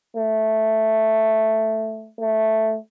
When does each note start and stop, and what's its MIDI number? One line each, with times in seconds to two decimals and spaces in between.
0.16 2.10 57
2.19 2.77 57